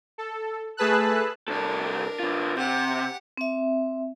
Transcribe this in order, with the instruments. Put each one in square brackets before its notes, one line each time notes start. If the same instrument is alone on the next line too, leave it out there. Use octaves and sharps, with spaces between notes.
[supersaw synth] A4
A3 G#4 B4 A5 E6 F#6
[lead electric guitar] C2 A4 [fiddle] D4 A#4
[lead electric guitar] D3 F4
[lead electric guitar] C3 [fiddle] G4 F#5
[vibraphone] C4 E5